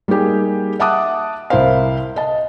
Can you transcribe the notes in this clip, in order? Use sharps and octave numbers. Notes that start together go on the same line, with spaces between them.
G3 A#3 D#4 G4 G#4
E5 F#5 A5 D6 D#6 F#6
C2 E4 A#4 C5 F5
D#5 A5